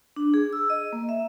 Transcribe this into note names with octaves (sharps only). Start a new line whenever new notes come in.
D4
G#4
E6
D#5
A#3
E5